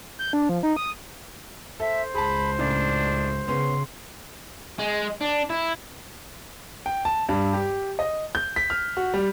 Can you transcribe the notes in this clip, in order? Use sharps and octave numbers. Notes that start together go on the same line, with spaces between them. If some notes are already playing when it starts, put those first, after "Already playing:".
G6
D4
F3
D#4
D#6
A4 C5 E5
C#2 G#4 A5 B5
A2 C#3 D4
C#3 B3 C#4 C6
G#3
D4
E4
G5
A5
G2
G4
D#5
G6
B6
F6
F#4
G3